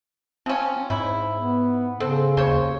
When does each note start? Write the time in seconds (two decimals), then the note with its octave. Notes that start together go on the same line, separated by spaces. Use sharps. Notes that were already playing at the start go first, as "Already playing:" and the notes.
0.46 F3 C4 C#4
0.90 G#2 E4
1.36 B3
2.00 C#3 C4 A4
2.37 D#2 C5 C#5